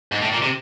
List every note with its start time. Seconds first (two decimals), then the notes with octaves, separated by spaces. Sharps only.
0.12 G#2
0.22 A2
0.32 A#2
0.42 C3